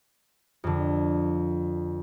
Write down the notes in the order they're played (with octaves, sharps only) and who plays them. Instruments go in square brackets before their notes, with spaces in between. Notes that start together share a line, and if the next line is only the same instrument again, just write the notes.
[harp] F2 D3